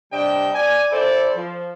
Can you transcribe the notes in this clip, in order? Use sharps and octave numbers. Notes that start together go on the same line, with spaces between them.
C3 G3 D4 D#5 G5
D5 G#5
C4 E4 A4 C5 D5
F3